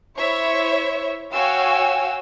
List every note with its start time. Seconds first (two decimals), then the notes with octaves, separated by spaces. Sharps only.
0.19 E4 C5 C#5 E5
1.33 F#4 C#5 F5 G5 G#5 E6